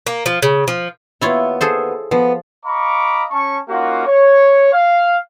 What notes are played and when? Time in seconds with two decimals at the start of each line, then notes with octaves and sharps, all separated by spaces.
0.06 A#3
0.26 F3
0.42 C#3
0.68 F3
1.21 D#2 B3 E4 F4 C#5
1.61 G#4 A4 C5
2.11 F3 B3
2.65 D#5 F5 A#5 B5 C#6 D6
3.31 C#4 A5 C#6
3.69 A#3 C#4 D#4 F4 F#4
4.06 C#5
4.73 F5